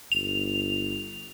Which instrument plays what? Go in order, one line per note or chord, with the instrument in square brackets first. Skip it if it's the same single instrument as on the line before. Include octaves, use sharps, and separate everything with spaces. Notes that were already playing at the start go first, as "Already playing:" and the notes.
[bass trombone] G1 [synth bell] F7